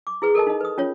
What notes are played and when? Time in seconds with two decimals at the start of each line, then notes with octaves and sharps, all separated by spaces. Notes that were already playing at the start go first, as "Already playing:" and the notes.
0.07 D6
0.22 E4 G#4 B4
0.35 A4 A#4 D#5 A5
0.47 D#4 D#5
0.61 B4 D#6
0.78 C#4 F4 C#5